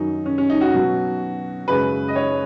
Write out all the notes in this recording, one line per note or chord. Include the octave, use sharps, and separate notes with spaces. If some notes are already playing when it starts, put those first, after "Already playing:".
Already playing: F#2 D#3 F#3 D#4
C#4
C#4
D#4
F#4
B2 F#3
F#2 C#3 G#3 B4
D#5
C#5